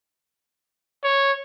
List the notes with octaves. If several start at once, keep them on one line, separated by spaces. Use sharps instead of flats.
C#5